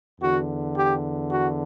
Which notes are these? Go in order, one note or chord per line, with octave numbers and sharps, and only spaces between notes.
E2 D3 F#4
G4
F#4